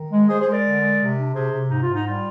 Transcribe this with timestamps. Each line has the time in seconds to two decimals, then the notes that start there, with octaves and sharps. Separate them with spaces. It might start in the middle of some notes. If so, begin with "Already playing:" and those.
Already playing: D#3
0.11 G#3
0.28 G#3 G#4 C5
0.40 G#4 C5
0.46 G#3
0.52 A#4 D5
0.63 D3
0.81 G#3
0.99 C3
1.16 D4
1.34 C3 G#4 C5
1.51 C3
1.69 G#2 D#4
1.81 F4
1.87 G#2
1.93 D#4
2.05 G3 F4